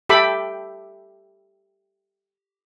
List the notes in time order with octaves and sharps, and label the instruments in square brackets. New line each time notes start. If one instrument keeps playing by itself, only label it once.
[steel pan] G4 A4 E5 G5 B5 D6